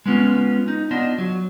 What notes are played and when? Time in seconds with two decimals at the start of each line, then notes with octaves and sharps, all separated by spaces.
0.06 G#3 B3 C#4 F4
0.68 D#4
0.91 B3 D4 F4 D#5
1.18 F#3